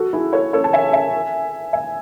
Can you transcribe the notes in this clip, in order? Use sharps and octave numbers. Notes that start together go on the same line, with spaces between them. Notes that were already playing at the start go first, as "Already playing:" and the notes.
Already playing: F#4 A4
E4 G#4
A4 C#5
A4 C#5
A5
E5 G#5
E5 G#5
E5 G#5